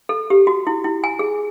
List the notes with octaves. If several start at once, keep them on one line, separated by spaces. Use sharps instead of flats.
A4
G4
F#4
E4
E4
G#5
G#4